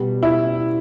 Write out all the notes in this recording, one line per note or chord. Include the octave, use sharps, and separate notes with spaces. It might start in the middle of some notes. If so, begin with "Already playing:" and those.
Already playing: B2 G3
E4